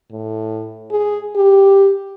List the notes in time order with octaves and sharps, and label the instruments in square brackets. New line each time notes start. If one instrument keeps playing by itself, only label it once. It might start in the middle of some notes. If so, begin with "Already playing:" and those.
[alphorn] A2
G#4
G4